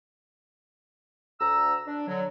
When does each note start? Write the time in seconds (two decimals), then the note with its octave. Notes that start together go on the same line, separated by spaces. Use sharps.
1.41 D2 A#5 E6
1.87 D4
2.07 D3 F#3